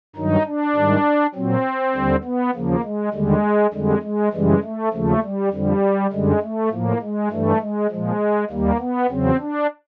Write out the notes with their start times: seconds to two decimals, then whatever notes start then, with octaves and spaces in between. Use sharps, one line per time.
0.16 G2 D#3 F#3 D#4
0.46 D4
0.75 G#2 D#3 G3
1.34 A#2 F#3 C4
1.95 D#2 D3 G3
2.24 B3
2.54 D#2 C#3 F3 A#3
2.84 G#3
3.13 D#2 D3 G3 G#3
3.73 F2 D3 G3 G#3
4.03 G#3
4.33 F#2 C#3 E3 G3 G#3
4.63 A3
4.93 D#2 C#3 F3 A3
5.22 G3
5.52 F2 D3 F3 G3
6.12 F#2 D3 G3 G#3
6.42 A3
6.71 A2 F3 A#3
7.02 G#3
7.31 G2 E3 G3 A3
7.61 G#3
7.91 A#2 F3 G#3
8.50 D#2 D#3 G3 A#3
8.80 B3
9.10 E2 C#3 F#3 C4
9.40 D4